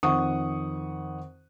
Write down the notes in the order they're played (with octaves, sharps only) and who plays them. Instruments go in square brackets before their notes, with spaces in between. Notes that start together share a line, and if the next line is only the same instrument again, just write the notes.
[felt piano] F2 D#3 F#5 C#6 D#6